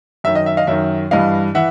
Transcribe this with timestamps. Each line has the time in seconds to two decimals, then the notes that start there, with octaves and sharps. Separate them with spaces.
0.24 F#2 D#3 E5
0.35 D#5
0.46 E5
0.57 D#5 F5
0.67 F#2 D#3 E5
1.11 G2 E3 D#5 F5
1.55 E3 E5 F#5